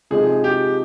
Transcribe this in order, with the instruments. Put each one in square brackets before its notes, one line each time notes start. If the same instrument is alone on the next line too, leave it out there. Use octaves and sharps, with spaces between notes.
[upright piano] C3 F3 G#3 D#4 [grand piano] G#4
[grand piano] G4